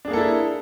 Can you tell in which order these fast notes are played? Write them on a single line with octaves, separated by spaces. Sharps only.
D4 G#4 A#3 A4 E4